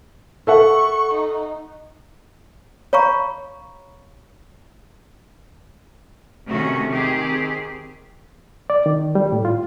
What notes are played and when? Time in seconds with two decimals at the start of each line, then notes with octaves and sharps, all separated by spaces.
0.47 A4 E5 F#5 C#6
1.14 D#4
2.93 C#5 F5 A#5 B5 C#6
6.47 C3 D#3 A3 C#4 F#4
6.90 D#3 C4 G4 G#4
8.70 D5
8.86 D#3
9.15 G3
9.32 A2
9.45 F4